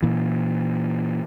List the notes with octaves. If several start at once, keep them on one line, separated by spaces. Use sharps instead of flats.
A#2 E3